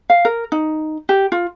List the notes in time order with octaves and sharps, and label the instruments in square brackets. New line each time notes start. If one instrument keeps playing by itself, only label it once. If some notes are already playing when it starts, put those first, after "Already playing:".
[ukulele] F5
A#4
D#4
G4
F4